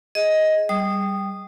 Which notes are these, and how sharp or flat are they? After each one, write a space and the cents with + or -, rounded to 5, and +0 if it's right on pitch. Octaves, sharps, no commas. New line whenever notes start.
G#4 +0 D#5 +10
G3 +0 D#6 -15